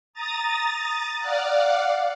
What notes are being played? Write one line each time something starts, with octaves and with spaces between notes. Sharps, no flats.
A#5 D#6 A6
D5 F5 F#5